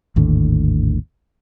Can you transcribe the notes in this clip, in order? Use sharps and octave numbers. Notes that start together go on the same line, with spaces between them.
G#1 D#2 A2 D3